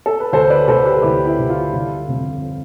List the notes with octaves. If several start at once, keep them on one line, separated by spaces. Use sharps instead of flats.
A4
B4
D2 A4 C5
B4 D5
D3 A4 C5
G4 B4
D2 E4 G4
E4
D3
F4
G1
F2 D3